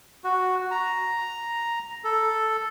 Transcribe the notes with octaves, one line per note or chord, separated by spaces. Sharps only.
F#4
A#5
A4